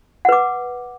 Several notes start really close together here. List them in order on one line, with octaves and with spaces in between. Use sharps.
F#5 B4 D6